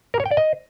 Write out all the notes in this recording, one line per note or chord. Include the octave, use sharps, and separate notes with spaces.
A#4
C#5
G5
D5
D#5